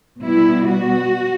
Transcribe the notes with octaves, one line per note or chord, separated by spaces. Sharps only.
B2 G3 B3 E4
F#4